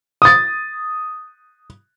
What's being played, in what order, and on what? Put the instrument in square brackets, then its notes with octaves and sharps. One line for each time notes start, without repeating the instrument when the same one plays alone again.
[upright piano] D#6 A6